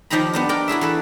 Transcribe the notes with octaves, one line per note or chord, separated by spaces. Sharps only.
D#3 F3 D#4 G4 A#5 B5
B3 D4 D#4
A#4 D5 G5
E4 F#4 G#4 E5
E3 A4 B4